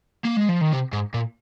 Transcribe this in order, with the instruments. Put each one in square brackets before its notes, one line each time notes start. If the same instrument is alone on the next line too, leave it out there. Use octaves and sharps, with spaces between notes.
[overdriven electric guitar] A#3
G#3
F3
D#3
C3
G#2
A#2